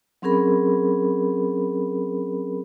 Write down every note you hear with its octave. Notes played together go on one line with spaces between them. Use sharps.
F#3 C4 C#4 G#4 A#4 B5